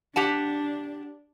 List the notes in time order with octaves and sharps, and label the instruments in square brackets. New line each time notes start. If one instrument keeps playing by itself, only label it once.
[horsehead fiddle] D4 [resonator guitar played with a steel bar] G4 F#5 A5